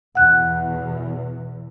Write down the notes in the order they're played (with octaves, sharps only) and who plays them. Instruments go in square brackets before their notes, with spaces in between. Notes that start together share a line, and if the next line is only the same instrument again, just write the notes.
[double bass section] E2 B2 E3 [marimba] F#5 F#6